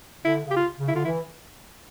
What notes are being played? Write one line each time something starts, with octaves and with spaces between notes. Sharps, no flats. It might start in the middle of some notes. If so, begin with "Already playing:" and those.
D3 E4
C#3
G4
F4
C#3
E4
D3 F4
E3 E4